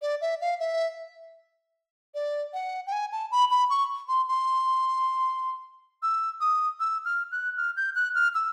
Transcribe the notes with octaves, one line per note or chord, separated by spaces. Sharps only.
D5
E5
F5
E5
D5
F#5
G5
G#5
A5
B5
B5
C#6
C6
C6
E6
D#6
E6
F6
F#6
F6
G6
F#6
F6
E6